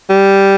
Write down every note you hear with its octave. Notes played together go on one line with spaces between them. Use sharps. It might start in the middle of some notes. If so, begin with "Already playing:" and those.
G3